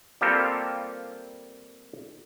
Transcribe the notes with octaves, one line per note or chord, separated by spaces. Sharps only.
G3 A#3 C4 F4 G4 A4